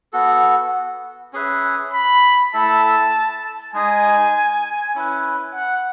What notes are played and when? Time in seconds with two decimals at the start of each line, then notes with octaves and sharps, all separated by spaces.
0.13 B3 F#4 A4
1.33 C#4 G#4 B4 E5
1.93 B5
2.53 A3 E4 A4 E5 A5
3.74 G#3 D#4 G#4 D#5 G#5
4.95 C#4 E4 B4
5.54 F#5